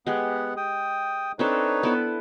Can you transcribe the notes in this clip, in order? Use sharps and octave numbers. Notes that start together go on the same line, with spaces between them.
G#3 B3 G4 F#5
G5 D#6
C4 D4 D#4 A4 B4 C#5
B3 E4 A4